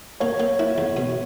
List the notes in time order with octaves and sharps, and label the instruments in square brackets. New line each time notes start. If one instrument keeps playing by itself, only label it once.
[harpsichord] A#3 [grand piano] C#5
[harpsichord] A#3
E4
E2
B2